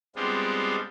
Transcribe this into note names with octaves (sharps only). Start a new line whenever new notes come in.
G3 G#3 B3 C4 D4 F4